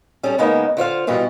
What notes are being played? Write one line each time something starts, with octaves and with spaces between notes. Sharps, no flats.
G3 C#4 G#4 A4
C#3 G#3 A#3 B3 D#4
D3 F4 C5 F5
G2 B2 E3 F4